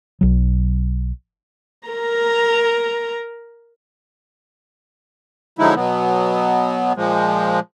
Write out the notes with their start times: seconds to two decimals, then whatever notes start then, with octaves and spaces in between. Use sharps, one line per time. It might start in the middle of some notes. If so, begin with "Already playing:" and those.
0.21 B1 F#3
1.88 A#4 A#5
5.59 D3 F3 F#3 G#3 D#4 E4
5.75 B2 F#3 B3
6.96 A#2 F3 G#3